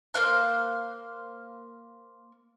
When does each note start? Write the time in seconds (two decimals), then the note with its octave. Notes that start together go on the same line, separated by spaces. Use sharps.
0.14 A#3 C5 F5 F#6